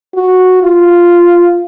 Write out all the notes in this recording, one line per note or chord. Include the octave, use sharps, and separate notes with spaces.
F#4
F4